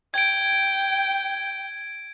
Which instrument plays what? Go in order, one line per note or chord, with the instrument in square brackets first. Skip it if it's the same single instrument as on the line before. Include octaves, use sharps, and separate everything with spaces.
[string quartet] G5 [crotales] G#6 D7